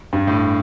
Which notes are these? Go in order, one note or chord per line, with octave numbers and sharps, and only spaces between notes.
G2
A2